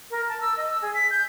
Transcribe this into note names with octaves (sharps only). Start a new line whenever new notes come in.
A#4
A5
E6
D#5
E6
G#4
B6
G6